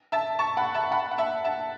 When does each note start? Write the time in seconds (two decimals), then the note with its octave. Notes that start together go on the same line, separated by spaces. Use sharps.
0.12 E5 A5
0.39 A5 C#6
0.57 F#5 B5
0.74 E5 A5
0.92 F#5 B5
1.11 F#5
1.18 E5 A5
1.44 E5 A5